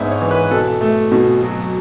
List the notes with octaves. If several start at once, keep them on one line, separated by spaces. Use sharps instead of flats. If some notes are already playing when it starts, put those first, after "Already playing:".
Already playing: G#2 B3 D4 E5
C#5
E3
B4
B2 A4
A3
B2
F#3